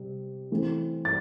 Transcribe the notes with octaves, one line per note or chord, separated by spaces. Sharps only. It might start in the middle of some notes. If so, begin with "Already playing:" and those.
Already playing: C3 G3
A2 E3 A3 C4
A6